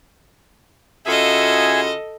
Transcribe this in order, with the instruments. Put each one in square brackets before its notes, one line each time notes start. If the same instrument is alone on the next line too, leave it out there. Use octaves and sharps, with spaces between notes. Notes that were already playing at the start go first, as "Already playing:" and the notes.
[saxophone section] C#3 F4 F#4 [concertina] G#4 E5 G#5 [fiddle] A4 D#5